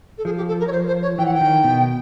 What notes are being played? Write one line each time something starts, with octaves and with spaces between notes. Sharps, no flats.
A4
F3 G#4
G4
A4
A#4
C#5
C5
C5
C#5
E3 G5
F#5
G5
D#3
B2